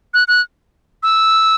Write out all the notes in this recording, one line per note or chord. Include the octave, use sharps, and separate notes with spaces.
F#6
F#6
E6